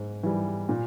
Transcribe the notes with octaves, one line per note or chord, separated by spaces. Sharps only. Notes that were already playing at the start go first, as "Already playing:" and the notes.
Already playing: G#2
E3 G3
A#2